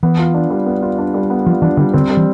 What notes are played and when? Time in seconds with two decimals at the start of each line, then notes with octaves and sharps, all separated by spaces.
0.03 E3 B3
0.19 F4
0.34 D4
0.50 G3
0.66 B3
0.83 F4
0.98 D4
1.14 G3
1.30 B3
1.46 F3 F4
1.62 E3 D4
1.77 D3 G3
1.94 D3 C4
2.10 G3
2.17 E3